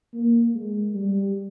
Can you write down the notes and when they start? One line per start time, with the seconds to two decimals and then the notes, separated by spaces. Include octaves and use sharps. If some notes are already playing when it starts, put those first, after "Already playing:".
0.13 A#3
0.55 G#3
0.95 G3